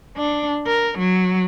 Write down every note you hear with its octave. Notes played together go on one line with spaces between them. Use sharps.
D4
A#4
F#3